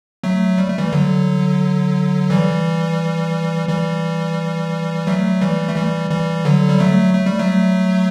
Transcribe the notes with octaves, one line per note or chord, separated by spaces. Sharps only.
F#3 A3
G3
A3
E3 G3
D3 F#3
E3 G3
E3 G3
F#3 A3
E3 G3
A3
E3 G3
E3 G3
D3 F#3
G3
F#3 A3
A3
G3
F#3 A3